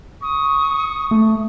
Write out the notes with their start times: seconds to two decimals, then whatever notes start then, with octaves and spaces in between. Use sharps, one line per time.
0.22 C#6 D#6
1.11 A3